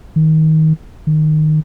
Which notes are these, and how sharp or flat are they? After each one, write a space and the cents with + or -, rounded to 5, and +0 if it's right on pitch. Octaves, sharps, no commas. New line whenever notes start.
D#3 +20
D#3 -15